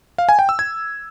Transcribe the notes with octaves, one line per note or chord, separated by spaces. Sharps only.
F5
G#5
G5
E6
G#6